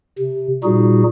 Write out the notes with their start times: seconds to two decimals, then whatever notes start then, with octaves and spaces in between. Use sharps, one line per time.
0.18 C3
0.64 A#2 G3 D#4 F#4 G#4